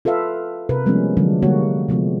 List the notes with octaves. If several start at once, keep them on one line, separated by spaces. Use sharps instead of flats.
F4 A4 B4 E5 F5
C3 A#4 B4
F3 G3 G#3 A#3 B3 C#4
D3 F3 F#3 G#3 D4
D3 G3 G#3 A#3 F#4 C#5
C3 F3 G#3 B3